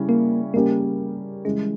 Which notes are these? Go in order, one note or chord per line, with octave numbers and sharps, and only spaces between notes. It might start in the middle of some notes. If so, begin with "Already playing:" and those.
Already playing: C#3 G3 C#4 E4
A#3
C#3 G3 A#3 C#4 G4 A#4
C#3 E3 G3 G#3